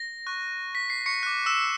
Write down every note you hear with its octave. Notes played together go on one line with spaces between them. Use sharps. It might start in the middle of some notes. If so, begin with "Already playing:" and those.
Already playing: A#6
C#6 F#6
B6
C7
C#6 C#7
D6 F#6
E6 E7